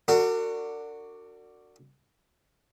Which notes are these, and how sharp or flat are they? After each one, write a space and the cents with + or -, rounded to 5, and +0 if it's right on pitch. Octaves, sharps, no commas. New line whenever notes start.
D4 +0 F#4 +0 A#4 -45